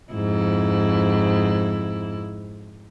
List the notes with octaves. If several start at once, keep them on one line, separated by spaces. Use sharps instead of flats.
F2 G#2 E4